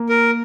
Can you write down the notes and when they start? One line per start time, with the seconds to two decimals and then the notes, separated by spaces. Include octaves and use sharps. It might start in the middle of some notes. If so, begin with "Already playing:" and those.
Already playing: A#3
0.09 A#4